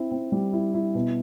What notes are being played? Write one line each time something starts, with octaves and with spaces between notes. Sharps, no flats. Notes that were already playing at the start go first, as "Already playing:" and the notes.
Already playing: C4 E4
C4
G3
E4
E4
B2